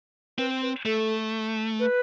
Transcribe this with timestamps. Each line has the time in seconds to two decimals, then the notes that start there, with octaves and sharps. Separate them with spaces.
0.38 C4 B4
0.62 B4
0.85 A3 A4
1.80 B4